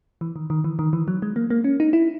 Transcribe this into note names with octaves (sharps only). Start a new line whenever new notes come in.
E3
D#3
D#3
E3
D#3
E3
F#3
G#3
A#3
A#3
C#4
D#4
E4